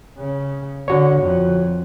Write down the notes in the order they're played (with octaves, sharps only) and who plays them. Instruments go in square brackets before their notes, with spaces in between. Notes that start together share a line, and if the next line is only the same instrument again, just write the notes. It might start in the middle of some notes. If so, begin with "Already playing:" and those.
[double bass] C#3
[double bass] D3 [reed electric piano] F#4 C#5
[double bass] F2